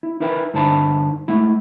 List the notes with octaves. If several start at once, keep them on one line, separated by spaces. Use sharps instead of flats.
E4
D#4 E4 A#4 B4 D#5 G5
G2 D3 D#4 C5 A5 B5
G#3 A3 E4